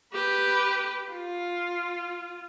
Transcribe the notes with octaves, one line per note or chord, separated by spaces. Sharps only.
G4 B4
F4